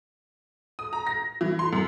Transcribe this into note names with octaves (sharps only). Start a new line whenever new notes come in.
D#6
A#5
A#6
E3
C6
F#2